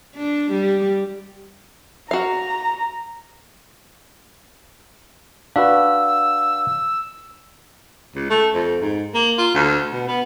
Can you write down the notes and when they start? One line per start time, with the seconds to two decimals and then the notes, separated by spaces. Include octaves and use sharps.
0.16 D4
0.52 G3
2.11 F#4 F5 A#5
5.56 D4 F#4 B4 F5 E6
8.15 C#2
8.30 A3
8.54 F2
8.81 G#2
9.14 A#3
9.38 F4
9.54 D2
9.92 B2
10.08 B3